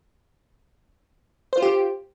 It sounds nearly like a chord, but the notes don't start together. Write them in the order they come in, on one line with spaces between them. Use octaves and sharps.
C5 F4 G4